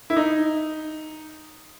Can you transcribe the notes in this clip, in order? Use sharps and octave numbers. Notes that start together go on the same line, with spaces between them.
E4
D#4